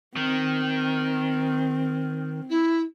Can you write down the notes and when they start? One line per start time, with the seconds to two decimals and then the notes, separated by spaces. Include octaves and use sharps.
0.16 D#3 C4
2.49 E4